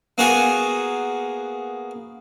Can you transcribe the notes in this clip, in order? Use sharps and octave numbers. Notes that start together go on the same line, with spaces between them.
A#3 B3 F#4 G#4 F#5 G#5